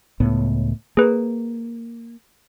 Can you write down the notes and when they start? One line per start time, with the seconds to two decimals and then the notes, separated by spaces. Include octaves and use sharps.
0.20 C#2 A2 B3
0.97 A#3 G#4 B4